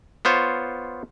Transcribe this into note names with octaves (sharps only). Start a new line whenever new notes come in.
B3 F4 C5 C#5